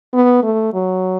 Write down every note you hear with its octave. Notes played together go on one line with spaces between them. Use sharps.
B3
A3
F#3